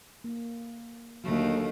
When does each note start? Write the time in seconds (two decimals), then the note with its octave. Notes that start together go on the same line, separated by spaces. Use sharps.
0.24 A#3
1.24 D#2 D3 F#3 A3